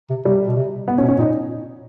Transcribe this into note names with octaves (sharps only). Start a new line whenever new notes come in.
C3
C3 G3
B2
C3
B3
C#4
B2
C#4
A#2 D#4